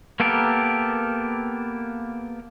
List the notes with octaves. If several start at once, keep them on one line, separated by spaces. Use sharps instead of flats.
A#3 B3 G4 A4 A#4